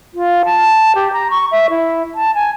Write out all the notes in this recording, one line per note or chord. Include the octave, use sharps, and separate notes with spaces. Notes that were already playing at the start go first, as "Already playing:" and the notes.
F4
A5
G4
A#5
C#6
E5
E4
A5
G#5